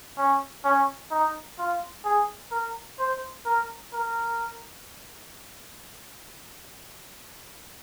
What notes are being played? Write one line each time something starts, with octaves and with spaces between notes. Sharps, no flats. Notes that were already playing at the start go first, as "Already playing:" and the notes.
C#4
C#4
D#4
F4
G#4
A#4
C5
A#4
A#4